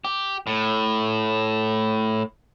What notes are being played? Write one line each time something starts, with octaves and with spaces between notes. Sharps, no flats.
G4
A2